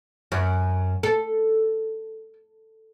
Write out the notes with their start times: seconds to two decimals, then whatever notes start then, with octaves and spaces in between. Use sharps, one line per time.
0.32 F#2
1.03 A4